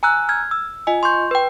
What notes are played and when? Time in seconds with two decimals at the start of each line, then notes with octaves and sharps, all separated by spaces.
0.03 G#5 A#5 E6 F#6
0.29 F6 G#6
0.51 E6
0.87 F4 D#5 G#5
1.03 C6 C#6 G6
1.31 B4 G5